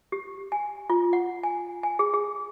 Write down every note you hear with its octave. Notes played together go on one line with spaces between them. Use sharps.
G4
G#5
F4
F#5
G#5
G#5
G#4
G#4